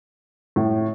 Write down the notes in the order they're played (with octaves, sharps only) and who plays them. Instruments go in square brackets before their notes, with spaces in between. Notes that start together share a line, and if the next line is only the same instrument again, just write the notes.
[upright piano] A2